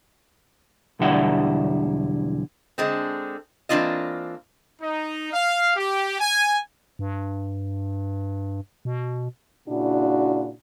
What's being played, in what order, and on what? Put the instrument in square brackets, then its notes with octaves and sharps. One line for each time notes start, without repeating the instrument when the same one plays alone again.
[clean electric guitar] B1 E2 D3 G3 E4 F#5
[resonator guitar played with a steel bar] D3 G#3 C4
E3 A#3 C4 D4 F4 D#5
[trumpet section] D#4
F5
G4
G#5
[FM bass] G2
B2
[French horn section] A#2 C#3 D4 E4 F#4